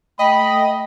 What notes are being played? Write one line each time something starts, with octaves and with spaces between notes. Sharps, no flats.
A3 D#5 G5 B5